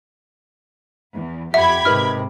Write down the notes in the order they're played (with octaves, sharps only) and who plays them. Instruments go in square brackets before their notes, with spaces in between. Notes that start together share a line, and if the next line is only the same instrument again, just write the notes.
[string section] E2
[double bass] F2 [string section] G4 B5 G#6 [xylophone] E5 [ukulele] F#5
[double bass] G#2 C3 [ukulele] D#4 A#4 B4 [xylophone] F6